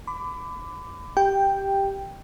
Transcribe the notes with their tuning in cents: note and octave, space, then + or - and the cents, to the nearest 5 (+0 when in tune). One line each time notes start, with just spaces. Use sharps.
B5 +35 D6 +0
G4 +0 G5 +5